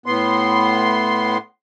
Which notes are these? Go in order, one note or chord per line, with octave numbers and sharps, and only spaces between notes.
A2 B3 C6